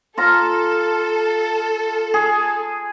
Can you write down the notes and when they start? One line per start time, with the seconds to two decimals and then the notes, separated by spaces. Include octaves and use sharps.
0.17 F4 A4 F5 A#5
2.14 G#4